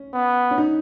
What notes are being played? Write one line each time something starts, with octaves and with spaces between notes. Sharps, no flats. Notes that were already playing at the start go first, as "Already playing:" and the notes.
Already playing: C#4
B3
C#4
D#4